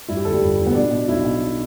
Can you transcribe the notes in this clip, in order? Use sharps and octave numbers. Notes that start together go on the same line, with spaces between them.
G2 E4
G4
G1 A4
G3
G1
G1
B3
B2 D4
B2
B1 E4
B2